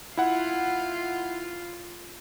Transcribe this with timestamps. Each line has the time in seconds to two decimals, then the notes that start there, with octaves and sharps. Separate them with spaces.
0.17 E4 F4 F#5